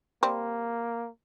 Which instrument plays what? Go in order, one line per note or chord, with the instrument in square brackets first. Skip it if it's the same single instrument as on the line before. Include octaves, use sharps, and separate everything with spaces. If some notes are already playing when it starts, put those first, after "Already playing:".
[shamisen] G3 C4 [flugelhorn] A#3